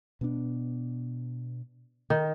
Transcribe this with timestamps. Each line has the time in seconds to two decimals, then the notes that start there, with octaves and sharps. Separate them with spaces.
0.21 B2 B3 D4
2.10 D#3